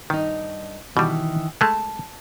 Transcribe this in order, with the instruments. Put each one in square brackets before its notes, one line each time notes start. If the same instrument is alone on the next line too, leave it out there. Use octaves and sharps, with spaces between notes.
[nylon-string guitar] G2 D#4 [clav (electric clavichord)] D#3
[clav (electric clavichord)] B2 G3 [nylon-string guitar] D#3 E3
[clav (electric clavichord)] G#3 A3 [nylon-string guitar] A5